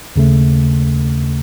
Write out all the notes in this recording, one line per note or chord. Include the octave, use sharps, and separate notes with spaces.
D#2 C#3 A3